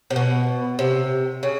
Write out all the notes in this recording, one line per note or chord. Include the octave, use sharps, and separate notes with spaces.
C3
B2
C3
C#3